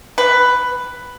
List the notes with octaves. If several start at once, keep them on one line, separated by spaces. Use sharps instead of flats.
B4